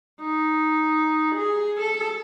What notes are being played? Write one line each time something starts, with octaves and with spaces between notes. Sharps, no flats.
D#4
G#4
A4